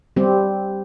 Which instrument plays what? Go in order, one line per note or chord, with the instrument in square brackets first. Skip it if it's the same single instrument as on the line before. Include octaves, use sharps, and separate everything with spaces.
[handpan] G3 C4 G4